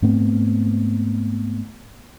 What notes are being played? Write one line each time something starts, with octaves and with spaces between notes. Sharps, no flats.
G#2 A3 B3 C4